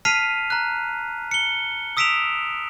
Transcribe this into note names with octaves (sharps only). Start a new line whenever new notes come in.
A5 F6 B6 C7 D#7 F7
A#5 F#6
C#7 G7
D#6 E6 B6 D7 E7 F7